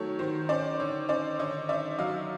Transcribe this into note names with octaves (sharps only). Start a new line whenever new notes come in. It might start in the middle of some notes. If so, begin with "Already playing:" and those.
Already playing: D#3 F#3 A3 C#5
D#3 C5
C#4 C5 D5
D3 C#5
C#4 C5 D5
D3 C#5 D#5
C#4 D5 E5
F#3 D#5 F5